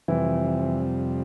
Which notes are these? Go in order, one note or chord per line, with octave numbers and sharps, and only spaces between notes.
F2 C3 E3 G3 E4